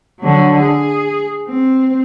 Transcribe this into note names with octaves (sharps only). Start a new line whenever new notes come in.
D3 F#3
G#4
C4